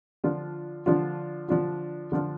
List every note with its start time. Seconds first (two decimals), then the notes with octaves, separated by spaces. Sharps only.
0.24 D3 F3 D4 F4
0.86 D3 F3 D4 F4
1.48 D3 F3 D4 F4
2.12 D3 F3 D4 F4